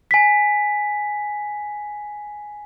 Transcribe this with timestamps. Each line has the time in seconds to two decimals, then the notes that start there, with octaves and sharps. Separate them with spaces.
0.11 G#5 B6